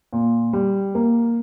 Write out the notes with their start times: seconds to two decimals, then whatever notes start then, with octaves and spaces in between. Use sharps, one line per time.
0.13 A#2
0.53 G3
0.95 A#3